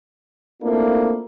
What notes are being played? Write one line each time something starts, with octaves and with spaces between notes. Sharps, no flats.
A3 A#3 C4 D4 E4 F4